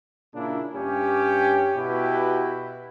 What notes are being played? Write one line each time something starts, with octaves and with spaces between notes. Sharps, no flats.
A#2 C#3 A#3 D4 E4
G2 C#4 G4
B2 E4 F#4 G4 B4